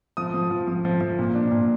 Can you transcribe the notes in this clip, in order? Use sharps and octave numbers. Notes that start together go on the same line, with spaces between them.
F3 D#6
F3
F3
F3
F3
F3
A#2
D4
A#2